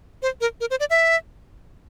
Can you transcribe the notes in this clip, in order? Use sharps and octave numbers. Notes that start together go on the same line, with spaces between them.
C5
A#4
A#4
C5
D5
E5